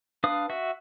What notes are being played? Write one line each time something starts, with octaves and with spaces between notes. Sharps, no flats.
D4 B4 F5 D#6
F#4 E5